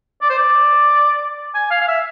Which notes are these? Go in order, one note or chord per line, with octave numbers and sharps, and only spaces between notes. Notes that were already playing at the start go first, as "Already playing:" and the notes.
D5
C5
D5
G#5
F5
F5
E5